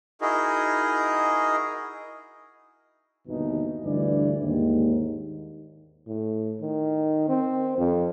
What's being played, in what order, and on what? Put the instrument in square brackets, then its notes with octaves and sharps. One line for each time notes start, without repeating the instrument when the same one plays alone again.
[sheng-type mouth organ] D#4 E4 F#4 G#4 A#4 D#5
[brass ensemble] G1 D#2 B2 E3 D#4
D2 G2 E3 D5
D#2 G#2
[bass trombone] A2
D#3
C4
F2